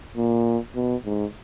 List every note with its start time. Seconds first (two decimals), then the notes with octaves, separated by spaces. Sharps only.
0.17 A#2
0.75 B2
1.05 G#2